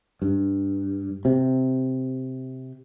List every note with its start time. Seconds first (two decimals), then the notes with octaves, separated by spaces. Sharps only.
0.22 G2
1.25 C3